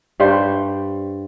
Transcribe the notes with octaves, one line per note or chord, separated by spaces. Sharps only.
G2 G3 C5